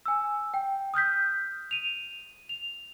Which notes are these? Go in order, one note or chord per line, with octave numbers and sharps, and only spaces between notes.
G#5 E6
G5
D#6 F6 G6 B6
D#7 F7
F7